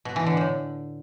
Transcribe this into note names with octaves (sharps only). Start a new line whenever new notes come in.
B2
E3
D3
A2